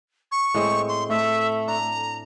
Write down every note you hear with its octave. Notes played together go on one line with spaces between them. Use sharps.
C#6
A2 G#3 C4
C6
A2 A3 E5
D4 A#5